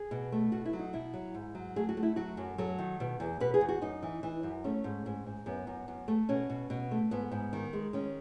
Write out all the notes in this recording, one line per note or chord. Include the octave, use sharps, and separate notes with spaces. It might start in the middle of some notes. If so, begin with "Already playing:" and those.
Already playing: G#4
B2
A3
B2 F#4
E4
F#3
D#4
B2 E4
F#3
G#2
F#3
A3 G#4
F#4
A3
E4
F#3 F#4
F#2
F#3 A4
D#3
B2
E2
B2 B4
G#4
E2
F#4
F#2 D#4
E3
E3
F#2
A3 C#4
G#2
G#2
G#2
F#2 B3
F#2
F#2
A3
B2 C#4
B2
B2
A3
G#2 B3
G#2
D#3
G#3
D#3 C#4